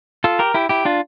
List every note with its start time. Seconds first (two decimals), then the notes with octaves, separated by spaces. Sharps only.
0.24 F4 A4
0.39 G4 A#4
0.54 E4 G4
0.69 E4 G4
0.85 D4 F4